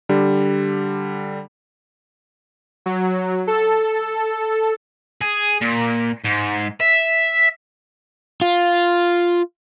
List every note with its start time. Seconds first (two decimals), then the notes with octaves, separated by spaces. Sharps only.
0.09 D3 G3
2.86 F#3
3.47 A4
5.21 G#4
5.61 A#2
6.25 G#2
6.81 E5
8.42 F4